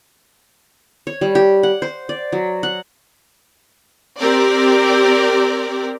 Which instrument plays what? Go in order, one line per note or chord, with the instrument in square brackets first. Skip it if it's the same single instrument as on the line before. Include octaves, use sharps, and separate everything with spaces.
[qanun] C#5
G3
G4
F#5
C5
D5
F#3
F#5
[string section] C4 G4 A#4 D5